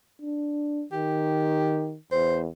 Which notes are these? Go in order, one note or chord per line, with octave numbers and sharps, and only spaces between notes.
D4
D#3 G4
E2 C5